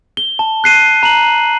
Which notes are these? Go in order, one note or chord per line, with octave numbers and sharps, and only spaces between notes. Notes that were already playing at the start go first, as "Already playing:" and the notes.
G7
A5
F#6 C7 D#7
A#5 F#7